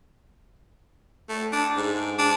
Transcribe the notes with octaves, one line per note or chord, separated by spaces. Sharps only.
A3
D4
G#2
D4